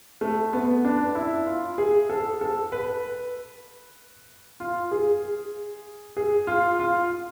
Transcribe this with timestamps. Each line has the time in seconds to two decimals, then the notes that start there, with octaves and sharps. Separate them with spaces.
0.21 A3
0.53 B3
0.85 D4
1.15 E4
1.46 F4
1.78 G#4
2.10 A4
2.41 A4
2.72 B4
4.60 F4
4.91 G#4
6.17 G#4
6.47 F4
6.79 F4